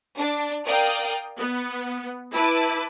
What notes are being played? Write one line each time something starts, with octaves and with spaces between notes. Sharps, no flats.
D4
A#4 D5 F5 G5 D#6
B3
E4 B4 A5 D6